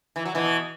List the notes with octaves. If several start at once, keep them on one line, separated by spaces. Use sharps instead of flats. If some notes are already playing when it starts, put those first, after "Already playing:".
E3
F#3
B2 E3